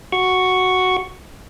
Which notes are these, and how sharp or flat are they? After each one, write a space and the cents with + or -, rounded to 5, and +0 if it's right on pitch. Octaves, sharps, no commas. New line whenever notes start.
F#4 +0 C#6 +0